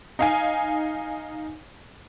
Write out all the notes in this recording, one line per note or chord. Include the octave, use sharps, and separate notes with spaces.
D#4 F5 G#5